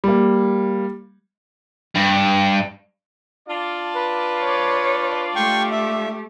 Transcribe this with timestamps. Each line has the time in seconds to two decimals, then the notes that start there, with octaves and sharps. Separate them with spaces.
0.04 G3 A#3
1.96 G2
3.49 D4 F4 D5
3.95 B4
4.43 C#5
5.35 A3 G4 G5 C6 C#6
5.72 E5